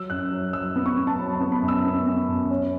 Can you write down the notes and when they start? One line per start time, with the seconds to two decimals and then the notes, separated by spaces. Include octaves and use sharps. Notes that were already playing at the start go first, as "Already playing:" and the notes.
Already playing: F#3 E6
0.10 F#2 F#6
0.31 F#3
0.53 F#3 E6
0.76 B3
0.86 C#6
0.97 B3
1.07 A5
1.19 F#3 B5
1.35 A5
1.41 B3
1.52 B5
1.62 F#2
1.68 E6
1.85 B3
2.06 B3
2.28 F#2
2.51 C#4